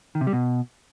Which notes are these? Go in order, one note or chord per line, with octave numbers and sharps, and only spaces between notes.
D#3
C3
G3
B2